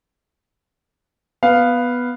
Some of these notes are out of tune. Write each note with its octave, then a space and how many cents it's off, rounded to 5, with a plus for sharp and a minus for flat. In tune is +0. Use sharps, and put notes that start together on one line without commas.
B3 +0 F5 +0